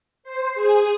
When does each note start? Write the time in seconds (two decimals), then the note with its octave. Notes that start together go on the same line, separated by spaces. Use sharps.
0.23 C5
0.55 G#4